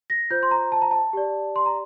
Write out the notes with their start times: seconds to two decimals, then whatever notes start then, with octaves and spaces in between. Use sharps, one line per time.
0.10 A#6
0.30 F4 C5 G6
0.43 C6
0.51 A#5
0.72 A5
0.82 A#5
0.91 A5
1.13 G4 D5
1.56 C6
1.66 A#5